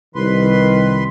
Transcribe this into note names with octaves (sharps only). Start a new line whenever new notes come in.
C2 D#3 B4 C6